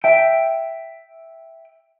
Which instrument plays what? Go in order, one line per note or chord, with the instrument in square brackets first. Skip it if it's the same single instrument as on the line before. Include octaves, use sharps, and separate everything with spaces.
[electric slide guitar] E5 G5